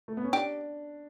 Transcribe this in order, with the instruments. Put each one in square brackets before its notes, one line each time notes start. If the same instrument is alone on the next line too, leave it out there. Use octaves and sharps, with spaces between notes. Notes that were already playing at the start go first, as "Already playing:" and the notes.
[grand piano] A3
B3
C#4
[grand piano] D4 [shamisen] G4